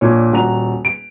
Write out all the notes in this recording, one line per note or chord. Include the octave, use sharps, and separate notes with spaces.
A#1 A#2 C#5
D#1 F#4 A#5 F#6 F7
D7